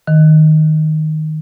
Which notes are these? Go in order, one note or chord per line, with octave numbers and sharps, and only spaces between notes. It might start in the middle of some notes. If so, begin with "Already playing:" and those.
D#3